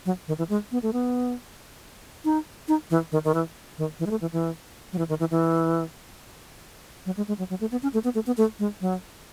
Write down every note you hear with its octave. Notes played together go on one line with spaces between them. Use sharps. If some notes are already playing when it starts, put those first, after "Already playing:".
F#3
D#3
E3
G#3
B3
A3
B3
D#4
D#4
E3
D#3
D#3
E3
D#3
E3
G#3
A3
E3
E3
F#3
E3
D#3
E3
E3
F#3
G#3
G#3
F#3
F#3
A3
B3
C#4
A3
B3
A3
B3
A3
G#3
F#3